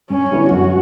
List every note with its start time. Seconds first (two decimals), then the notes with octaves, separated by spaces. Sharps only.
0.10 G2 C#4
0.31 D3 G3 B3 E4
0.51 F#2 F#4